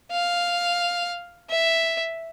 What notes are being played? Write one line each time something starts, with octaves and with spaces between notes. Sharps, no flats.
F5
E5